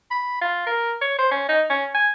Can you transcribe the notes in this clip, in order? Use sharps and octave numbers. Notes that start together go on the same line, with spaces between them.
B5
F4
A#4
C#5
C5
C#4
D#4
C#4
G#5